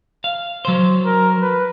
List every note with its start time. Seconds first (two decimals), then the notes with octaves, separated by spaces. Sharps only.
0.24 F5
0.65 F#3 C5
1.05 A#4
1.41 B4